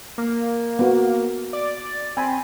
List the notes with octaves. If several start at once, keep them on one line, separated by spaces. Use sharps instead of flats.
A#3
B3 F#4
D5
C4 G#5 B5